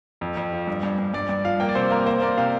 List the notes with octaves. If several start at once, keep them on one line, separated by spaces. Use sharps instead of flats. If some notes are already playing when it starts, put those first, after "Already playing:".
F2
F2
F3
G2
G2
G2
G2 D5
G2 D5
F3 F5
A#3 G5
D5
C3 C5
A#3 A#4
A#3 C5
A#3 D5
C3 F5